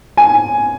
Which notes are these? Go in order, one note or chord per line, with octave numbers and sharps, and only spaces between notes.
G#5